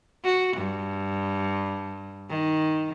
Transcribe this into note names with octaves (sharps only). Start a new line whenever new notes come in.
F#4
G2
D#3